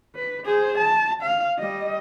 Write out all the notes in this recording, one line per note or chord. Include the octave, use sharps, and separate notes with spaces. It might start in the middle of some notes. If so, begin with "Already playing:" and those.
B4
G#4 C5
A5
F5
G3 D#5